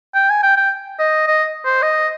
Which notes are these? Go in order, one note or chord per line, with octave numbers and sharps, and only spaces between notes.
G5
G#5
G5
G5
D#5
D#5
C5
D#5